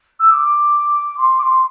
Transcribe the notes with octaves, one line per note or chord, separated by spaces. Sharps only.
E6
D6
C6
D6
C6